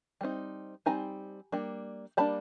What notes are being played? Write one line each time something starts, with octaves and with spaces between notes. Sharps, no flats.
G3 C4 D#4
G3 C4 D#4 G#5 A#5
G3 A#3 D4
G3 A#3 D4 A5 B5